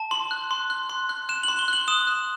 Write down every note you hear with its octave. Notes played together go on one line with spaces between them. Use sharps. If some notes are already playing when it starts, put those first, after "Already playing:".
Already playing: A5
C6 F#7
F#6
C6
F#6
C6
F#6
F#6 E7
C6 F#7
G7
F#6 F#7
D#6 E7
F#6